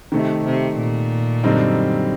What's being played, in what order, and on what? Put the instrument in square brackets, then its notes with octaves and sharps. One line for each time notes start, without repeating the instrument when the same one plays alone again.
[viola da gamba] C3 [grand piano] D#3 A3 D#4
[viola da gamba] C3
A#2
[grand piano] F#2 D3 G3 C4 D#4